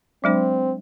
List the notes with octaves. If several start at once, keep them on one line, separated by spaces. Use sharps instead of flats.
F#3 G#3 C4 D4